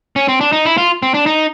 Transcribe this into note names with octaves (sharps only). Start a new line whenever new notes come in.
C#4
C4
D4
D#4
E4
F4
C4
D4
D#4